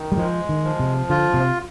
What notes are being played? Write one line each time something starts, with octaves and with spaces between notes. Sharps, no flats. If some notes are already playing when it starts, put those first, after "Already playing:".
Already playing: D#3
G3
F3 G#3
D#3
F3
C3
D3 F4
C3